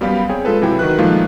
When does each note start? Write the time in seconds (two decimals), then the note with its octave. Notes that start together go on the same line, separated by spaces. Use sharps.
0.01 F#2 G3 B3 G4 F5 B5
0.29 C4 G#4 C#5 G5
0.45 G#3 F4 A4 B4
0.61 C3 E3 F#3 E4 G5
0.79 D#3 F#4 B4 F#6
0.99 A#2 F3 G#3 A3 D#4 F4